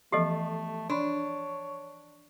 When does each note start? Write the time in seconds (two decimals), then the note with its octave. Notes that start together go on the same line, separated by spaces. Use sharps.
0.12 E3 F3 A3 B3 G4 A4 D#5
0.90 D4 C#5 D5 B5 C6